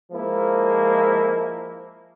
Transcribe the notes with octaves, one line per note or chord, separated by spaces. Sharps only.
F3 G#3 A#3 E4